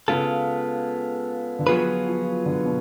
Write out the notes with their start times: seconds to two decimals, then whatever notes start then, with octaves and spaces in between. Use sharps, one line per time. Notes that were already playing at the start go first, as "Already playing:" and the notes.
0.08 C#3 G#3 B3 F4 A4
1.59 D3
1.66 F3 F#3 B3 F4 G#4 B4
2.07 F3
2.46 D3
2.66 B2